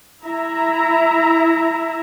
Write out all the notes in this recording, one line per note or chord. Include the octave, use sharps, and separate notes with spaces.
E4 E5 A#5